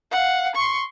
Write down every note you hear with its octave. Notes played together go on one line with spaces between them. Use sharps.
F5 F#5
C6 C#6